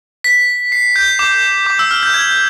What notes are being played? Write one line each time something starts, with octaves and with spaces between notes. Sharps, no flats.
B6
C7
G6
D6
D6
E6
F6
G6
G#6